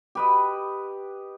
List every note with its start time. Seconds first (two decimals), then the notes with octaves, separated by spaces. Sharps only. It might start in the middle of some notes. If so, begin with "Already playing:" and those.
0.15 G4 B4 D#5